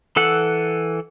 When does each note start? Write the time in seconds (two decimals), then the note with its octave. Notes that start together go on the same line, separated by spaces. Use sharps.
0.16 E3 A4 F#5